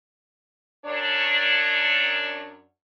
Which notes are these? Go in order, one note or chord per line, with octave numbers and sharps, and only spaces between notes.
F#2 D4 C#5